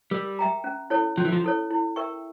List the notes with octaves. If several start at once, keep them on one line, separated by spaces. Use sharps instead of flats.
G3 A#4
E5 G5 A#5
C#4
E4 A4 C#5
F3 C#4
E3
F3
E4 A4 C#5
E4
A#4 E5 G5 C#6